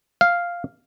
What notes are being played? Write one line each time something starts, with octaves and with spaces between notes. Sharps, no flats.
F5